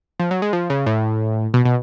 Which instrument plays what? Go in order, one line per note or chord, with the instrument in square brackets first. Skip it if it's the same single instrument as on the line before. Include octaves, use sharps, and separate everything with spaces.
[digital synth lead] F3
F#3
G#3
F3
C#3
A2
B2
B2